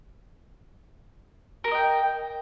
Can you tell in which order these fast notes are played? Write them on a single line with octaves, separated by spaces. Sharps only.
A#4 A4 D#5 G5